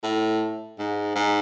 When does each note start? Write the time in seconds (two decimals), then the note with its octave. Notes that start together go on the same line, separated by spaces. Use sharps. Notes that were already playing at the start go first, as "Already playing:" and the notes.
0.03 A2
0.78 G#2
1.16 G#2